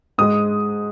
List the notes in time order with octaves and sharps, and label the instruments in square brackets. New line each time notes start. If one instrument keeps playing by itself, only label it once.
[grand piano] G#2 G#3 D#6